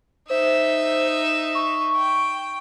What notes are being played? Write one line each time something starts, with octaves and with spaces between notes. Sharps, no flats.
D#4 C5 E5
C#6
G5